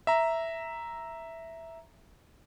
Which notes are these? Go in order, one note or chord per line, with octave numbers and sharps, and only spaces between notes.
E5 A#5